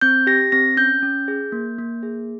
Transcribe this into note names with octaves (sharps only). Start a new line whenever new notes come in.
C4 G6
G4 A#6
C4 A#6
C#4 G6
C#4
G#4
A#3
A#3
G#4